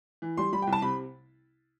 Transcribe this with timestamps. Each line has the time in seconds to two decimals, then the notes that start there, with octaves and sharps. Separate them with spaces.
0.22 E3
0.37 G3 C6
0.53 G3 B5
0.62 G5
0.67 C2
0.73 A5
0.82 C3 B5